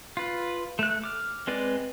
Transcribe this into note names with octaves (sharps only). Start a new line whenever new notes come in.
F4 B4
A3 F#6
D6 F6
G#3 C4 B4 D5